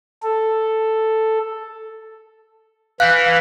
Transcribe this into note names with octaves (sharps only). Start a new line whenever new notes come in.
A4
E3 F5 F#6 G6 B6